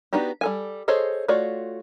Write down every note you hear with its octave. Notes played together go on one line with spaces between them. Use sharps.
B3 D4 D#4 F#4 G4
G3 A4 G#5
G#4 A4 C5 C#5 D#5
A3 F4 F#4 C#5 D5